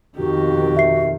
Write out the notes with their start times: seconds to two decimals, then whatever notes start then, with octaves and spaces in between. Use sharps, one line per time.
0.16 F2 B2 D#3 F#4 G4
0.77 E5 C7